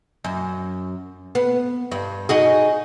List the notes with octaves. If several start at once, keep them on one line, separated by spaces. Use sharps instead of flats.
F#2
B3
G2
D#4 F#4 G#4